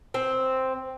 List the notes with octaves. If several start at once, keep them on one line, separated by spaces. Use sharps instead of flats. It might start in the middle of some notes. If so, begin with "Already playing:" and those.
C4